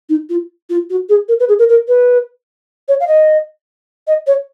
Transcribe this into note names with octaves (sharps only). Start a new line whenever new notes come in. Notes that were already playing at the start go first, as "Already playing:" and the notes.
D#4
F4
F4
F#4
G#4
A#4
B4
G#4
A#4
A#4
B4
C#5
F5
D#5
D#5
C#5